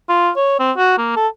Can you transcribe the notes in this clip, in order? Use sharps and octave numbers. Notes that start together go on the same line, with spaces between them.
F4
C#5
C4
F#4
A#3
A4